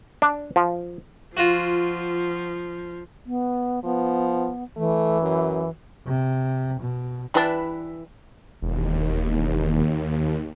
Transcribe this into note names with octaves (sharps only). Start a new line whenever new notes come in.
D4
F3
F3 F4 F#4
B3
F3 B3
E3 A3
F#2
C3
B2
E3 G3 D4 E4 B4
E1 D#2